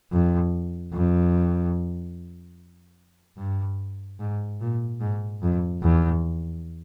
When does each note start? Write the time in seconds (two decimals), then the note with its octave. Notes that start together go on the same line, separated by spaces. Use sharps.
0.12 F2
0.93 F2
3.37 G2
4.19 G#2
4.61 A#2
5.01 G#2
5.42 F2
5.82 E2